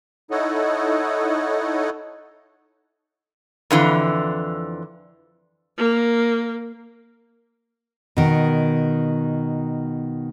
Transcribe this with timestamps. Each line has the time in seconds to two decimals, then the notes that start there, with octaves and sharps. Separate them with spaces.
0.31 D#4 E4 A4 C#5 D#5 F#5
3.71 F2 D3 E3
5.77 A#3
8.17 B2 D#3